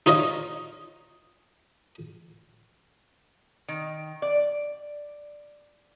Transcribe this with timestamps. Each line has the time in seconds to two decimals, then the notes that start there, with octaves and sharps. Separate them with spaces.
0.06 D#4 F4 C#5 D#5
3.68 D#3
4.22 D5